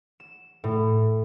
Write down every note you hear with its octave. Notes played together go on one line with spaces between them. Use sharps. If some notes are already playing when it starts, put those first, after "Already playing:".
E7
A2